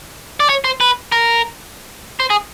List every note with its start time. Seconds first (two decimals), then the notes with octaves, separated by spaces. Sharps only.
0.40 D5
0.49 C#5
0.64 C5
0.81 B4
1.12 A#4
2.20 C5
2.30 G#4